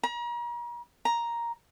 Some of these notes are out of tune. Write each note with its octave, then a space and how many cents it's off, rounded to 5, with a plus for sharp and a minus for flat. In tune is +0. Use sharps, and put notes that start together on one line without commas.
A#5 +40
A#5 +5